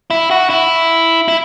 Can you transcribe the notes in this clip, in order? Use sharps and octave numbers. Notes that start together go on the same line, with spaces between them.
E4
F#4
E4
E4